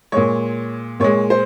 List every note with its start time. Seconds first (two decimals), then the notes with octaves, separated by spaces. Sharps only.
0.12 A#2 G#3 C#5
1.00 A#2 G#3 C#5
1.30 C5